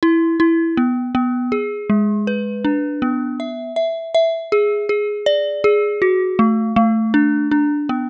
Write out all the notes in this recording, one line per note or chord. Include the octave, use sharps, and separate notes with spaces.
E4
E4
B3
B3
G#4
G#3
B4
D4
B3
E5
E5
E5
G#4
G#4
D5
G#4
F#4
A3
A3
D4
D4
B3